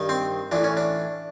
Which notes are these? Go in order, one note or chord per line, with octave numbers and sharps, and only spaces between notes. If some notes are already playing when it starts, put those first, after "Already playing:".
Already playing: G2 D#3
C4
A2 E3 D4
C#4
D4